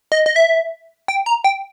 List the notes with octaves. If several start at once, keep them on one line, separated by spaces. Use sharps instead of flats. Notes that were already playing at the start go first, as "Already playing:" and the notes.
D#5
D#5
E5
G5
A#5
G5